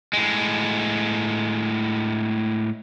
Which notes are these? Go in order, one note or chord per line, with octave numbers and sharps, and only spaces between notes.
A2 G#3